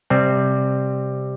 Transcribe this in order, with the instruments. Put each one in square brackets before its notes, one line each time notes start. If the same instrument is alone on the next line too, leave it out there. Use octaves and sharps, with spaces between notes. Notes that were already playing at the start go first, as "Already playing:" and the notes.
[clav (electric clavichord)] C3 G3 C4